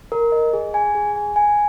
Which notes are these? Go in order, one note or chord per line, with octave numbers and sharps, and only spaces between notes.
A#4
D#5
G#4
G#5
G#4
G#5
G#5